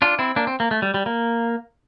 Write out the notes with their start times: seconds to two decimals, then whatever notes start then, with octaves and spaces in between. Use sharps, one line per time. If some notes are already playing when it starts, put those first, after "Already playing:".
0.02 D4 F4
0.19 C4 E4
0.36 A#3 D4
0.47 C4
0.60 A#3
0.71 A3
0.82 G3
0.94 G3
1.06 A#3